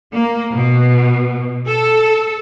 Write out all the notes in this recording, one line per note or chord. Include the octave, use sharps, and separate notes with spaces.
A#3
B2
A4